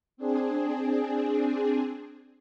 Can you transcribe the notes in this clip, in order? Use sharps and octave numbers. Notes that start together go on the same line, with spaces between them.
C4 D4 G#4